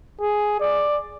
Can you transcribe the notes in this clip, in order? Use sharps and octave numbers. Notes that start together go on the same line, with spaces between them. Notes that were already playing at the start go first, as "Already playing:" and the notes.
G#4
D5